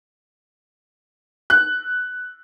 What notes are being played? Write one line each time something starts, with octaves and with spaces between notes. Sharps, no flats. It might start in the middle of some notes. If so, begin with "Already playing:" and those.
F#6